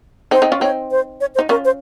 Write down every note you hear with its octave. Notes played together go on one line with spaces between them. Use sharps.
C4 D#4 C5
C4 D#4
C#4 F4
C4 D#4 C#5
C5
C#5
C5
D#4
C#4 F4 A#4
C5